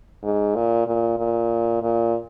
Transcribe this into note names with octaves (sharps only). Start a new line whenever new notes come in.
G#2
A#2
A#2
A#2
A#2